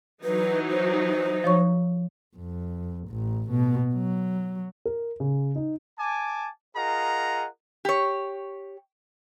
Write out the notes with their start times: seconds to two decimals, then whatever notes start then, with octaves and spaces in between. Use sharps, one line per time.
0.24 E3 F#3 D#4 B4
0.70 C5
1.44 F3 C#5 C#6
2.37 F2
3.08 A1
3.50 B2
3.94 F#3
4.85 A#4
5.20 C#3
5.56 D#4
5.99 G#5 A5 D6
6.76 F4 G#4 A#4 D#5 F#5 A#5
7.85 G4 C#5